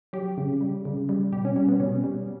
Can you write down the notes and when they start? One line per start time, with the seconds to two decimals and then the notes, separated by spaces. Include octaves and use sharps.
0.13 F#3 G4
0.38 C#3
0.61 G3
0.85 C#3
1.09 G3
1.32 B2 G4
1.45 C#4
1.56 G3 C#4
1.69 B3
1.80 B2 C#4
2.04 G3